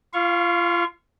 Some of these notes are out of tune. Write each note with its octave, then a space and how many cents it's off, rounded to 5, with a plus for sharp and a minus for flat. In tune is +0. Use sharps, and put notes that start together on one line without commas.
F4 -30 F5 +0 C#6 -10